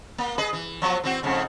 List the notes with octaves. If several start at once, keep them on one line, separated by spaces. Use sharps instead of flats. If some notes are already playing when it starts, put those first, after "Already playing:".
A#3
G#4 B4 D#5
E3
F3 F#3 B3
E3 C4 F#4
F2 G#2 C#3